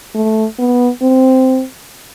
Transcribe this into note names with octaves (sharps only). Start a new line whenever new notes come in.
A3
B3
C4